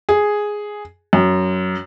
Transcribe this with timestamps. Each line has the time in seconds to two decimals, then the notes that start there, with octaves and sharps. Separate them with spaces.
0.09 G#4
1.13 F#2